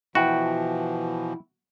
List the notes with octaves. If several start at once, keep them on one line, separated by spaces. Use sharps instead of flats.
B2 E3 F3 E4 F#4 G5